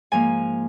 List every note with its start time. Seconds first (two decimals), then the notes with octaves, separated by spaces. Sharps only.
0.12 G#2 F3 A#3 G#5